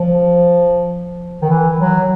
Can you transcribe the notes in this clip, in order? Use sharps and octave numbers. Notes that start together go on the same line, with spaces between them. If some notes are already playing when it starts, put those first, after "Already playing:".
Already playing: F3
D#3
E3
F#3